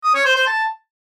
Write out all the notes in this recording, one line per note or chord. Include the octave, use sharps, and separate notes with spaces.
D#6
C#5
C5
C5
A5